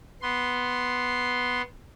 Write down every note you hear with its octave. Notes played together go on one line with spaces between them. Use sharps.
B3 C6